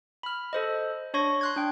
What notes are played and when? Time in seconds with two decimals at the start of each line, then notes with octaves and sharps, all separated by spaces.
0.23 B5 F6
0.53 A4 C5 D#5
1.14 D4 C#5 C#6 A#6
1.41 C6 F#6 G#6
1.56 D4 G5